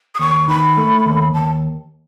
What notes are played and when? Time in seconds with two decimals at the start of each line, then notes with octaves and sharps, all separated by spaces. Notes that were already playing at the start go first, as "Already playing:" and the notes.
0.15 D#6
0.19 D#2 C#6
0.48 D#3 B5
0.77 A3
1.06 D#2
1.34 D#2 A5